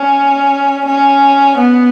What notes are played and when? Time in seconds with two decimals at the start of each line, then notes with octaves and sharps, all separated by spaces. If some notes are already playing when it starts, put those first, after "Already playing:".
Already playing: C#4
0.86 C#4
1.58 B3